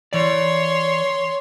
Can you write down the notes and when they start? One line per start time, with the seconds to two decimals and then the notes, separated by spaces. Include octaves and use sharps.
0.13 E3 C#5 D5 C6